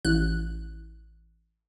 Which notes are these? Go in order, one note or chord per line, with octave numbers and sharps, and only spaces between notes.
A1 F#6